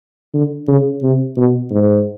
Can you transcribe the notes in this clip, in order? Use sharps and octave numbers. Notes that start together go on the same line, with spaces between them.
D3
C#3
C3
B2
G#2